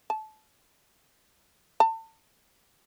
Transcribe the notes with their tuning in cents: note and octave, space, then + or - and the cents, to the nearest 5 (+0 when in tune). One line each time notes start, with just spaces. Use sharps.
A5 -25
A5 +35